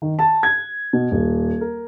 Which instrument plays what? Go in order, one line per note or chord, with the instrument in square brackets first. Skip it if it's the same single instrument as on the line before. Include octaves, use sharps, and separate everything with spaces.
[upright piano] D#3
A5
G#6
B2
D#1
A#4